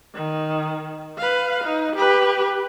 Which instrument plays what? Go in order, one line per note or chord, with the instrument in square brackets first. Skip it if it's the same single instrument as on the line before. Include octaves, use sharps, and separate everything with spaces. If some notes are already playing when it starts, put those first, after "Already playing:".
[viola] D#3
B4 F5
D#4
G4 B4